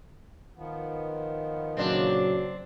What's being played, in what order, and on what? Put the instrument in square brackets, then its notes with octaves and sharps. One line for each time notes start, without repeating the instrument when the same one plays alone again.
[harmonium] D#3 F3 B3
[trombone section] A#2 C#3 F#3 [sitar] C4 D4